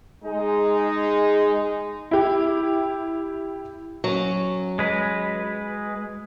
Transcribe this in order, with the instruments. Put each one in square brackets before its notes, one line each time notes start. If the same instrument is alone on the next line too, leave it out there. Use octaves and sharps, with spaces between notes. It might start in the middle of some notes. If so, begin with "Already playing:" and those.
[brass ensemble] G#3 D#4
[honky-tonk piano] E4 G4
[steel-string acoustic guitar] F#3 C#4
[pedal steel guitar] G#3 B4